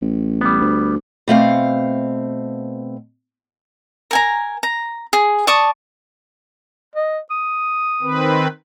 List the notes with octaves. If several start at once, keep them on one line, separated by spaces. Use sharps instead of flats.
A1
G3 B3
D2
B2 A3 C4 F5
A#4 G#5 A#5
A#5
G#4
D5 A5 C#6 D#6
D#5
D#6
D#3 C4 B4